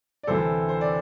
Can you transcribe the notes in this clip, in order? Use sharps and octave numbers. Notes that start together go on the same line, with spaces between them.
D5
D2 C3 E3 A4 C5
C5
D5